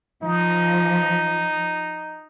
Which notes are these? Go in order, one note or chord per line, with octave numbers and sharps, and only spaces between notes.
F3 D#4